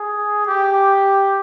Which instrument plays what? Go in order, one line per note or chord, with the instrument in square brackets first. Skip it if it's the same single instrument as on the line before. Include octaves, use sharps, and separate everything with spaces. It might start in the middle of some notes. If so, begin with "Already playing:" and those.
Already playing: [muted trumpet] G#4
G4